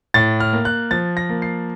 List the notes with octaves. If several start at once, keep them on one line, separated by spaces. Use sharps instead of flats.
A2 A6
F6
A#3
F#6
F3 A6
A#6
A#3
C7